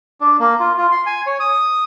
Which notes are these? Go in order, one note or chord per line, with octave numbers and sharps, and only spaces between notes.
D4
A#3
F4
F4
C6
G#5
C#5
D#6